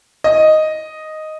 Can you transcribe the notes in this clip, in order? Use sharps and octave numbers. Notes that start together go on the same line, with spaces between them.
D#5